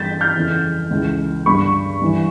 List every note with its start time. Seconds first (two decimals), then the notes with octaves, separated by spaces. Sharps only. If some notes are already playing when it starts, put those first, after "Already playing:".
Already playing: G2 E3 G6 A6 B6
0.21 F6 G6
0.35 F2 C#3 E3
0.91 C#2 C#3 E3
1.46 G2 D3 B5 C#6
2.01 G2 E3